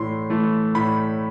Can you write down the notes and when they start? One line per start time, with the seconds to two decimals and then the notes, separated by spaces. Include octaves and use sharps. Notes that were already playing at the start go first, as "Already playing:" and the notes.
Already playing: A2 E3 A3 C6
0.30 E3 A3
0.75 A2 B5